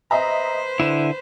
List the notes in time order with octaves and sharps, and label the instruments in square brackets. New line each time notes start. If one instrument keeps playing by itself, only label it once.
[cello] B4 C5 [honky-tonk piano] D#5 E5 A#5
[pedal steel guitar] D3 E4 [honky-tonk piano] E7